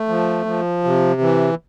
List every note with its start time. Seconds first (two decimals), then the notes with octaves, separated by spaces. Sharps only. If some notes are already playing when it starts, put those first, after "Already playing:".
Already playing: A3
0.08 F3
0.46 F3
0.84 C3
1.21 E3